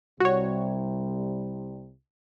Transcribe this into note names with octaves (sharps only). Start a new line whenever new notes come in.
C2 C3 G3 F#4 C#5